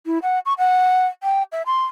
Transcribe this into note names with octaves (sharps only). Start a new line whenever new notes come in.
E4
F#5
C#6
F#5
G5
E5
C6